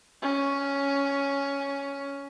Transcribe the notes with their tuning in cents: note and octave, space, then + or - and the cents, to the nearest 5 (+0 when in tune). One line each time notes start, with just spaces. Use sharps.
C#4 +5